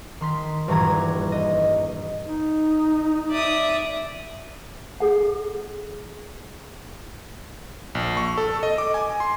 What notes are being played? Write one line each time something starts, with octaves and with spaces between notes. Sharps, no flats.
D#3 C6 B6
D#1 G2 E3 F#4 A#5 G#6
D#5
D#4
D5 E5 D#6
G#4 A4 F#5
A#1
C#6
A4
D#5
D6
G#5
C6